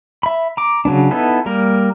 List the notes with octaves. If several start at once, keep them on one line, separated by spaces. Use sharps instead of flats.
E5 B5
A#5 D6
C#3 F#3 B3 D4
B3 D#4 E4 A4 B4
G3 A#3 A#4